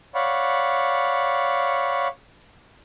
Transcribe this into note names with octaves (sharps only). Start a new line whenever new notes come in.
C#5 D5 F5 F#5 B5